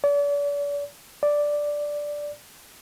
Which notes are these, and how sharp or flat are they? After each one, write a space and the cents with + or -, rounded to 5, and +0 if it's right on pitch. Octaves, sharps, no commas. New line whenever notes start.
D5 -40
D5 +0